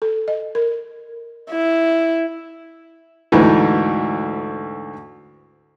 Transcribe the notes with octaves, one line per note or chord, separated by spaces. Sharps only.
A4
D#5
A#4
E4
D2 G#2 E3